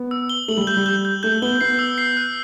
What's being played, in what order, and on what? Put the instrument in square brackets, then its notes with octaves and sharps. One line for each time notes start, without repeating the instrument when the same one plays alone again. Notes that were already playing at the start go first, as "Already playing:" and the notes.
Already playing: [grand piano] B3
[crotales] E6
G7
[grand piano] A3 [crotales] F#7
[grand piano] G3
[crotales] G6
[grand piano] G3
[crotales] G6
G6
[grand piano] A3 [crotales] G6
[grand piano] B3 [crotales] G7
[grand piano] B3 [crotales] C7
[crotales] E6
C7
F#6